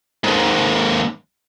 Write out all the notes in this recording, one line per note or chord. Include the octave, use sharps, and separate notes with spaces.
D#2 G#2